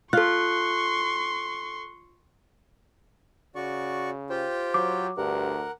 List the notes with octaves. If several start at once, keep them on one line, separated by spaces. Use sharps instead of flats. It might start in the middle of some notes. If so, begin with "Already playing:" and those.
F4 A4 C6 C#6 F#6
C#3 F#4 D5 C#6
F4 G4 C5 G5
F#3 D6
D2 G2 A#4 F#5